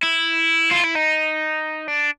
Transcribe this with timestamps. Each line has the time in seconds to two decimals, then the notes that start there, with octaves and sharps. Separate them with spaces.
0.03 E4
0.71 F4
0.84 E4
0.96 D#4
1.88 D4